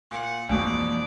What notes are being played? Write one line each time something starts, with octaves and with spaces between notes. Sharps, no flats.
A#2 F#5
F2 G#2 B2 E3 A#3 D5